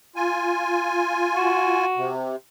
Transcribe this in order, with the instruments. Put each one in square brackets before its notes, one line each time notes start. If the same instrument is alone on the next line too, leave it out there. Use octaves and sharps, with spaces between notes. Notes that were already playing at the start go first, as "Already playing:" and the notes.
[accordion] F4 G#5
[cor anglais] F#4
[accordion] C3